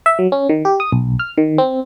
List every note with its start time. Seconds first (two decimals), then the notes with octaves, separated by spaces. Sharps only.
0.06 E5
0.19 F#3
0.32 C#4
0.49 D#3
0.65 G4
0.80 D#6
0.92 B1
1.19 F6
1.38 D#3
1.58 C4